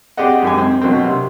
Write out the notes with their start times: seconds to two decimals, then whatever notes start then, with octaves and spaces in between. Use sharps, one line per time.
0.17 C4 G4 G#4 D5 D#5 F#5
0.43 G#1 F#2 G4 G#5
0.58 C4
0.81 B2 F#3 A#3 C4
1.04 C3